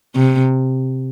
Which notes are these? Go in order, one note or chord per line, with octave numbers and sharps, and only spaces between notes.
C3